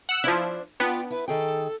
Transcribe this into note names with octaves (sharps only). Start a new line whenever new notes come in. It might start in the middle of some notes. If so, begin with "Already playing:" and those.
F#5 E6 F#6
F3 D4 E4 C5
B3 D4 F4 G5
E4 B4
D#3 G#4 A4 G5